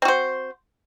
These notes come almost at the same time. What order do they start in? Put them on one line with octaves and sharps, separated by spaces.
C4 F#4 C5